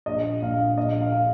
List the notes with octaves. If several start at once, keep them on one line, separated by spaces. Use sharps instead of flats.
A#1 D#5
A#1 F5
A#1 D#5
F5